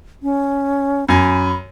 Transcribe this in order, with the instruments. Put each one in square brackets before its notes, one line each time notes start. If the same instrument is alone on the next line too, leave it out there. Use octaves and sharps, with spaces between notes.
[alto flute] C#4
[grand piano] F#2 G#5 [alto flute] B5